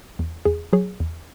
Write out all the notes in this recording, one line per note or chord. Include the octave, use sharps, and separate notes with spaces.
E2
E2 G#4
F#3 G#4 C#5
E2